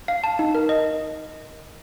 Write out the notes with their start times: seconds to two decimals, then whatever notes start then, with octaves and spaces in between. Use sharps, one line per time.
0.08 F5
0.24 A5
0.39 D#4
0.55 A#4
0.69 D#5